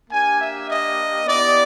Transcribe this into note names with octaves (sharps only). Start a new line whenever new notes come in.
A#3 D4 G4 G#5
E5
D#5
B3 E4 G4 D5